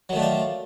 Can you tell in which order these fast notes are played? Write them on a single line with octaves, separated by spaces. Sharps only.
F#3 D#3 A3 D4 F4